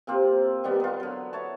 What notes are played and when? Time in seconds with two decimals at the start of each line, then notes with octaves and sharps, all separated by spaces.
0.07 C3 A#3 C4 F4
0.64 D#3 G3 B3
0.80 B3 F4
1.00 D3 F#3
1.33 E4 C#5 A5